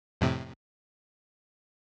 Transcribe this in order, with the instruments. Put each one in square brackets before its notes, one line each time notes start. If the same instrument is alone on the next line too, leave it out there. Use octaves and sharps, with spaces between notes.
[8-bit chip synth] F2 A2 C3